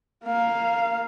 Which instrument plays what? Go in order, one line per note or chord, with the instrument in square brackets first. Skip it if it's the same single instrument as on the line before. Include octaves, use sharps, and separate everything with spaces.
[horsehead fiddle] A#3 F5